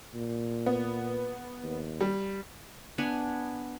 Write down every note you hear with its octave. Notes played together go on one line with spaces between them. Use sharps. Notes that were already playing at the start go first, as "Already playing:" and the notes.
A#2
B3
D#2
G3
B3 D4 G#5